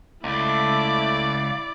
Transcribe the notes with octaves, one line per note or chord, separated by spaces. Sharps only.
C#2 A3 E4 D5